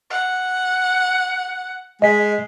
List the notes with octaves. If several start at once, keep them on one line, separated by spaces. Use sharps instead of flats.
F#5
G#3 D#5 B6